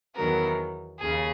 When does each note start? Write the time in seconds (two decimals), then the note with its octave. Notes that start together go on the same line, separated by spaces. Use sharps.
0.15 E2 D#3 F#3 B3 A#4
1.00 D#2 C#3 G#4